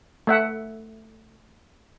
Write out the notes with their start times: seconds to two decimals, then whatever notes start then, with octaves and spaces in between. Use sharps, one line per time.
0.27 A3 E5 F#5